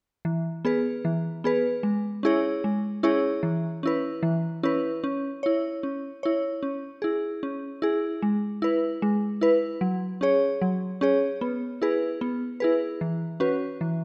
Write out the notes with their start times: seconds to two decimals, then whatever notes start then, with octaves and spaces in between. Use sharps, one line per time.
0.25 E3
0.65 B3 G#4 B4
1.05 E3
1.44 B3 G#4 B4
1.83 G#3
2.23 C#4 E4 G#4 C#5
2.64 G#3
3.03 C#4 E4 G#4 C#5
3.43 E3
3.83 C#4 E4 B4
4.23 E3
4.63 C#4 E4 B4
5.04 C#4
5.43 E4 C#5
5.83 C#4
6.23 E4 C#5
6.63 C#4
7.02 E4 G#4
7.43 C#4
7.82 E4 G#4
8.22 G#3
8.62 E4 B4
9.02 G#3
9.41 E4 B4
9.81 F#3
10.21 C#4 G#4 C#5
10.62 F#3
11.01 C#4 G#4 C#5
11.41 B3
11.82 E4 G#4 B4
12.21 B3
12.60 E4 G#4 B4
13.01 E3
13.40 C#4 F#4 B4
13.81 E3